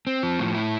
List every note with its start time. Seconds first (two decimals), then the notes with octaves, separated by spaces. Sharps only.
0.07 C4
0.23 F3
0.39 A2
0.55 E4